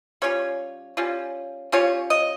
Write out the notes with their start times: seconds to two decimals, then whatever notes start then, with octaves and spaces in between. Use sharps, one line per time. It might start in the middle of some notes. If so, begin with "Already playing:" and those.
0.22 G3 C#4 F4 C#5
0.97 G3 C#4 F4
1.72 G3 C#4 F4 C#5
2.10 D#5